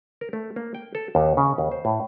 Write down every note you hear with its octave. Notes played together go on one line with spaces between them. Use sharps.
A#4
A3
A#3
G5
A4
D#2
C#3
D#2
C5
A2